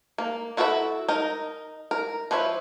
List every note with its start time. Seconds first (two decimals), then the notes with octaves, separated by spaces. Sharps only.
0.18 A#3
0.57 E4 F#4 A4 B4 E5
1.08 D#4 A#4
1.91 A#4
2.31 F3 B4 C#5 E5